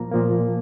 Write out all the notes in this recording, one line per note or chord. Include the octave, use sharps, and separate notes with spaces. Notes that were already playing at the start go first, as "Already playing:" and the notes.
Already playing: A#2 F3 A#3 A#5
A#2 F3 A#3